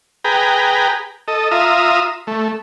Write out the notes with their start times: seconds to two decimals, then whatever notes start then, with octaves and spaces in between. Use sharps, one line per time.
0.24 G#4 B4 G5 A#5
1.28 A4 D#5
1.51 F4 E5 A#5 D#6
2.27 A3